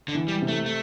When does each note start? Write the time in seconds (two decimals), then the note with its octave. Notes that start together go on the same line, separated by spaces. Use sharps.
0.08 D3
0.15 E3
0.28 G3
0.42 C3
0.48 A3
0.66 A3